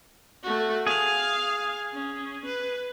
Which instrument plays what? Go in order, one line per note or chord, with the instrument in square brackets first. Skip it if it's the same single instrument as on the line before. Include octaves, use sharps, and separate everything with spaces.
[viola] A3 F#4
[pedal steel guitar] G#4 [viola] F5
[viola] C#4
B4